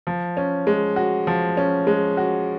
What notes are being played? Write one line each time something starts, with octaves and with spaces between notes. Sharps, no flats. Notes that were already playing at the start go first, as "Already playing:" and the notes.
F3
C#4
G#3
F#4
F3
C#4
G#3
F#4